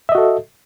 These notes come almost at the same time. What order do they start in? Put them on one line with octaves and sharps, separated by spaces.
E5 D#5 F#4 A4